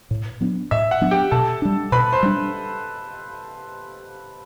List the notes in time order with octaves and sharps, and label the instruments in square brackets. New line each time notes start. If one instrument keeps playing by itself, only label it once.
[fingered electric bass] A2
F#3 B3 D4
[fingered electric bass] A2 [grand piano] E5
[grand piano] F#5
[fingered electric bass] F#3 B3 D4
[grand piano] G4 G5
[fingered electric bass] B2 [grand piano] A4 A5
[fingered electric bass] G3 D4
[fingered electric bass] B2 [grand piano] B4 B5
[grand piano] C5 C6
[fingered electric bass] G3 D4